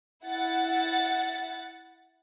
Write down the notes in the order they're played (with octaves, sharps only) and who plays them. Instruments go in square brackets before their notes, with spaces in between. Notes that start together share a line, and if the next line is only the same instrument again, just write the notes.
[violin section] E4 F#5 A6